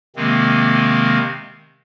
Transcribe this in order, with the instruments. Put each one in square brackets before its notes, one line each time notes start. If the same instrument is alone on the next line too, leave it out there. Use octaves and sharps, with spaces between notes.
[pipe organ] C3 D#3 G#3 A#3 C4